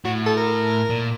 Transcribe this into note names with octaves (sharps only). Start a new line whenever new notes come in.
A2 F#4
A4
A#4
A#2